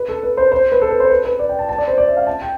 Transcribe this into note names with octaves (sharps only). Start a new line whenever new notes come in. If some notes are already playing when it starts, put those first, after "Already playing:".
Already playing: B4
A4
B4
C5
C5
B4
A4
B4
C5
B4
B4
D5
G5
A5
A5
D5
C5
D5
E5
F5
A5
G5